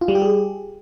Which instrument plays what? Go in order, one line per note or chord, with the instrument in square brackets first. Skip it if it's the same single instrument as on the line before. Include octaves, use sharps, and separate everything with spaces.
[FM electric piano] F4
G3
G4
G#4